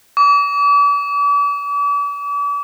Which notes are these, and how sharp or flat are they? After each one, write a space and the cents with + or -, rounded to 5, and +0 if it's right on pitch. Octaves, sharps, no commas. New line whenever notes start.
D6 -40